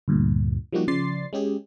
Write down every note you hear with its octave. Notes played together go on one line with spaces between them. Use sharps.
D2 G2 A#2
F3 G3 A#3 D#4 F#4 G4
C#3 F3 D5 C6 A6 C7
G#3 C#4 G4 G#4